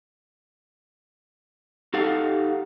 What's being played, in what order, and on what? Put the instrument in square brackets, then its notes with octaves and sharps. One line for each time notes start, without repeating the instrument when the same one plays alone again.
[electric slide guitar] D#4 G4 A4 F5 F#5